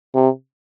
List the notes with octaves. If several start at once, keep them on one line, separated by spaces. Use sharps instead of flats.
C3